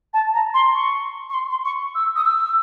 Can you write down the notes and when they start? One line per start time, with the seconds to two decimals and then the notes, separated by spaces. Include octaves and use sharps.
0.13 A5
0.33 A#5
0.54 C6
0.74 C#6
1.29 C#6
1.33 C6
1.49 C6
1.64 C#6
1.94 E6
2.15 D#6
2.24 E6